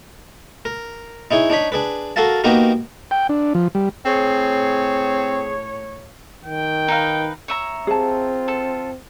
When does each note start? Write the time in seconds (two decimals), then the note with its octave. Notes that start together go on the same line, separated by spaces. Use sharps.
0.65 A#4
1.31 D#4 E4 G#4 C#5
1.50 D4 D#4 C#5 B5
1.72 D4 G#4 B4
2.16 F#4 A4 A#4 F5 A5
2.44 A#3 B3 D#4 F#4 G4 A#4
3.11 G5
3.29 D4
3.55 F3
3.75 G3
4.05 A2 C4 G#4 C#5
6.45 D#3 G5
6.88 D#4 B4 F5
7.48 C#5 E5 A#5
7.87 C4 F4 G#4 A5
8.48 A4